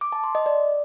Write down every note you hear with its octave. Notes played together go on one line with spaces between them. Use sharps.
D6
A5
C6
D#5
D5